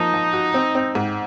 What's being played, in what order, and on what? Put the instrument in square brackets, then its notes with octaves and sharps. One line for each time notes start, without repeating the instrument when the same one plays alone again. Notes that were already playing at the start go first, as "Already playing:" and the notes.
Already playing: [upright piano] F3 A#3 [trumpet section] D#4
[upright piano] F3
F#4
C4
C4
G#2